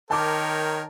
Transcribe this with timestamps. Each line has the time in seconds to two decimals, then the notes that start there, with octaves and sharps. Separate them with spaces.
0.11 D#3 A#4 C#5 G5 A5 D6